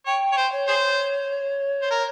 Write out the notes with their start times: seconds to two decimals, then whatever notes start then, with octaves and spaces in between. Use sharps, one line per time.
0.06 C#5 G5
0.32 C#5
0.37 C5
0.52 C#5
0.68 G#4 C5
1.82 C5
1.90 A#4